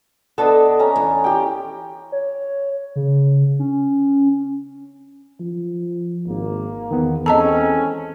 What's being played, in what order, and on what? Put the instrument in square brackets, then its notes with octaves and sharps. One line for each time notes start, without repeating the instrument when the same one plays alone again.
[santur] B3 D4 D#5 [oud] A4
[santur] C#4 A#5
[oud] E2
[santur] G4 G5
[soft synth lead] C#5
C#3
C#4
[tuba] F3
[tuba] G#1 [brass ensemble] A#3
[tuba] E2 [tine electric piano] D#3 B3
[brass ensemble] G#3 C4 C#4 [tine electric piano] A4 [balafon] D#5 A5 A#5